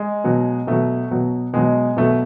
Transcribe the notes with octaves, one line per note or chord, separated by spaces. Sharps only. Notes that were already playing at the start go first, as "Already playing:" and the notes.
Already playing: G#3
B2 F#3
B2 F#3 A3
B2 F#3
B2 F#3 G#3
B2 F#3 A3